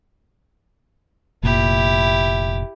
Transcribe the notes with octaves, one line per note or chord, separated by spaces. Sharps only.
F1 A#2 E4 G4